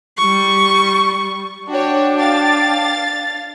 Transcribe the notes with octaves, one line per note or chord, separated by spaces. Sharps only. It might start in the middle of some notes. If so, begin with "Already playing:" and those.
G3 C#6
D4 F#4 C#5 G5 A5 D6
F5 A6